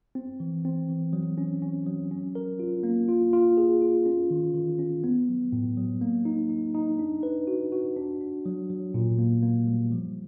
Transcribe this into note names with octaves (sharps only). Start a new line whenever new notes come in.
C4
E3
C4
E3
F#3
C#4
C#4
F#3
C#4
A#4
F4
A#3
F4
F4
G#4
F4
C#4
D#3
D#3
C#4
B3
F#3
A2
F#3
A#3
D#4
D#4
D#4
D4
B4
F#4
F#4
D4
D4
F#3
F#3
A#2
A#3
A#3
G3
F3